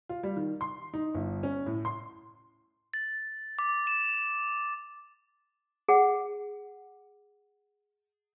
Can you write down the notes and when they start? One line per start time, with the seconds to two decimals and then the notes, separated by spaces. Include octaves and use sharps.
0.09 F4
0.23 G3
0.36 D#3
0.61 C6
0.94 D#4
1.14 G1
1.43 C#4
1.66 A2
1.85 C6
2.94 A6
3.59 D6
3.87 E7
5.88 G#4 F#5